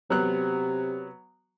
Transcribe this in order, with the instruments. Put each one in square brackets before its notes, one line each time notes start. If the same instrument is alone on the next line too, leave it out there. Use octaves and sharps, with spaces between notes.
[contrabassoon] C3 [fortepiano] F#3 B3 F#6